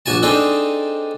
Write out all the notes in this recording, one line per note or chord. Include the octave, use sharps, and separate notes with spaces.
A#1 F#4 G#5 A5
C4 D4 D#4 G#4 A4